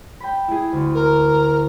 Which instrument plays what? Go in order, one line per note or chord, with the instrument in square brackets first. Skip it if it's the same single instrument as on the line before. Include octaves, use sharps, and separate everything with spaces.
[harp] G5 B5
E4 G#4
D2
[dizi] A#4